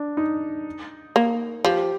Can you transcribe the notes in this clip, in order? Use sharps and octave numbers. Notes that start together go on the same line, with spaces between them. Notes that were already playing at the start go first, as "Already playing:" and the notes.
Already playing: D4
D#4
A#3
F3 G4